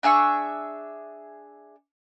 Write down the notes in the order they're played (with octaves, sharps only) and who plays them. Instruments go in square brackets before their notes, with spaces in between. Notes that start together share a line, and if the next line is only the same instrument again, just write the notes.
[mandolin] D4 G#4 E5 C#6